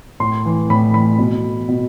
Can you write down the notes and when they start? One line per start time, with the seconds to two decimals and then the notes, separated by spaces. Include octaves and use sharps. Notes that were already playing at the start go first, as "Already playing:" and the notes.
0.20 A2 C6
0.45 E3
0.70 A2 B5
0.94 E3 B5
1.18 B2
1.68 B2